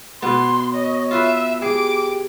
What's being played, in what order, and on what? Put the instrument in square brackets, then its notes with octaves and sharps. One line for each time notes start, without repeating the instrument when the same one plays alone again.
[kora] B2 B3 [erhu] C6
[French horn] C#5 [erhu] D#5
[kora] F4 B4 [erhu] E5
[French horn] G4 [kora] G#4 [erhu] D6